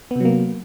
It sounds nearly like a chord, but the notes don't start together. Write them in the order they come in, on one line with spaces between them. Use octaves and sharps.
B3 C3 F#3 A#3